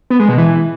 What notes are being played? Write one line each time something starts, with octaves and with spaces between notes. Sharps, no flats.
B3
G#3
B2
E3